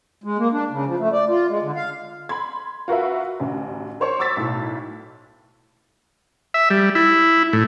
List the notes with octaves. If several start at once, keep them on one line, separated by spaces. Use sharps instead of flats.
G#3
A#3
D4
C#3
F3
A3
D5
F4
G#3
D3
F5
B5 C6 G#6
F4 F#4 A#4 B4 E5
A1 D2
A#4 C5 C#5 C#6
C#6 D6 E6 G#6 A6 B6
B1 A2
E5
G3
E4
A2